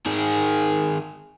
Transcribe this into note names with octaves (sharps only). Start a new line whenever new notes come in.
D#3 G#4